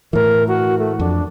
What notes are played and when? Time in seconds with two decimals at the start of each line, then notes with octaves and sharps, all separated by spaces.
0.13 A2 E3 A#4
0.48 F#4
0.79 A3
0.99 F2 D4